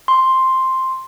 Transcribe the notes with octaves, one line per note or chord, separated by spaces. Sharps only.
C6